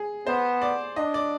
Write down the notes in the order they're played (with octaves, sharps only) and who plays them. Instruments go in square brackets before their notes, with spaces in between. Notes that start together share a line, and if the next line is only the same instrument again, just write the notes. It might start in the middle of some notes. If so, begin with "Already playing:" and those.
Already playing: [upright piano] G#4
[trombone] B3 [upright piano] C5
[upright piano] D5
[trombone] D4 [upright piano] D#5
[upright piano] D5